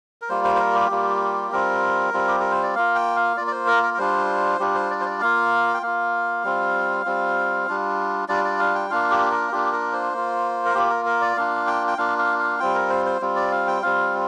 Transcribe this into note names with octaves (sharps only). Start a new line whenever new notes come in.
A#4
G3 A#3 F4 C5
C5
C5
A#4
G4
G3 A#3 F4
G3 C4 F4 A#4
G3 C4 F4
G4
A#4
C5
D5
A#3 F4 F5
G5
F5
A#3 F4 D5
D5
C5
A#4
A#4
A#4
G3 D4 F4 C5
G3 D4 F4 G4
C5
D5
C5
D5
A#3 F4 F5
G5
A#3 F4 F5
G3 C4 F4
G3 C4 F4
G3 D4 F4
G3 D4 F4 D5
D5
F5
G5
A#3 D4 F4 F5
G4
A#4
A#3 D4 F4 G4
A#4
C5
A#3 F4
A#4
A#3 F4 G4
A#4
A#4
D5
A#3 D4 F4 F5
G5
G5
A#3 D4 F4 F5
F5
F5
G3 C4 F4 G5
A#4
C5
C5
G3 C4 F4
D5
F5
G5
G3 C4 F4 F5